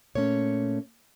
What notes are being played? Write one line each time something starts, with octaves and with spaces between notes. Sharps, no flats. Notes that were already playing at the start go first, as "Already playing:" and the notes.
A#2 A3 C#4 C#5